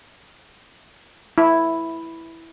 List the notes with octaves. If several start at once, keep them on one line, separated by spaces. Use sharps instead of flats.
E4